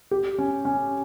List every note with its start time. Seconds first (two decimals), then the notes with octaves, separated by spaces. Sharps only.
0.11 G4
0.38 C#4
0.65 C#4